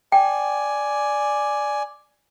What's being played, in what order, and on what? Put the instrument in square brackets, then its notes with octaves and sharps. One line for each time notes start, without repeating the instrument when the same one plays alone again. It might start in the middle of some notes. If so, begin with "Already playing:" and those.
[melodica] D5 G#5 [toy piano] G5